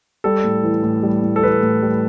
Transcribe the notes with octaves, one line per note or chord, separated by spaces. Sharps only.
G3 A4
A2
E3
A2
G3
A2
A4
E3 B4
A2
G3